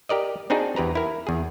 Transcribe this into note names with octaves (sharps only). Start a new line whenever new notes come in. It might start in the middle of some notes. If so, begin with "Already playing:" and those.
G4 A#4 D5 D#5
C4 D4 D#4 F#4 G#4
E2 G4 B4 A#5
E4 A#4
E2 G#4